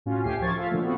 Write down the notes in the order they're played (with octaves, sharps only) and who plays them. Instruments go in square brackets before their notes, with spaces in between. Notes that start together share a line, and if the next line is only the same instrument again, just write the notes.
[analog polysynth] A2 C#4 F4 F#4
D2 A3 G4 G#5 C7
F3 A#4 C#6 G#6 A6
F4 A4 E5 F5
A#2 D3 F3 A3
B3 C4 F#4 A4